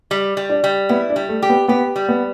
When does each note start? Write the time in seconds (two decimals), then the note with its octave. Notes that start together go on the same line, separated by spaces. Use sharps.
0.11 G3
0.37 G3
0.50 D4
0.64 G3
0.89 B3 E4
1.10 D4
1.16 G3
1.29 A3
1.42 G4
1.49 B3
1.68 B3 G4
1.96 G3
2.09 B3